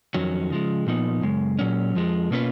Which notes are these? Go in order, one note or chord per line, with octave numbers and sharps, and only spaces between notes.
F2 D#3 F#3 C#4
C#3 F3 G#3
A#2 F3 B3 D#4
F#2 C#3 G#3
A#2 F#3 C#4
F2 F3 G#3
B2 A#3 C#4 F4 B4